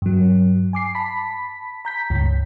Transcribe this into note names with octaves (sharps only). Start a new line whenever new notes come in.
G2 F#3
G#5 D6 C7
A5 B5 B6
A#5 G6 B6
C#2 G2